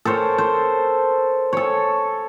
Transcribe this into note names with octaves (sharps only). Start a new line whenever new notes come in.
A4 A#4 C5 C#5
C5
A4 C#5